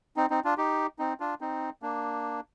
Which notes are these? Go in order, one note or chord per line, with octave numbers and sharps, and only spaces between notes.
C4 D#4
C4 D#4
D4 F4
D#4 G4
C4 D#4
D4 F4
C4 D#4
A#3 D4